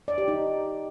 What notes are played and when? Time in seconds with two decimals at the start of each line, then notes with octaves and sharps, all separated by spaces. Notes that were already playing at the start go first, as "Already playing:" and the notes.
0.08 D5
0.18 G4
0.28 D#4